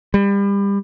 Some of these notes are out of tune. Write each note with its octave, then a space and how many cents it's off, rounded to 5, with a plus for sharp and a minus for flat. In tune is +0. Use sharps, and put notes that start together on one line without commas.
G3 +30